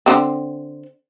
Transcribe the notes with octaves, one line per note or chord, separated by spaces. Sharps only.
D3 C4